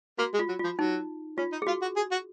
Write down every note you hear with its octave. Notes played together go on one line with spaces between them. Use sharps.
A#3 F#4
G#3
F4
F#3
F4
F3
F#3 D#4
C#4 F4
D#4
G#4
F4 F#4
F#4
G#4
F#4